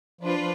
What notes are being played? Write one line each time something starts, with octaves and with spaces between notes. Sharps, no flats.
F3 D4 F4 B4
F3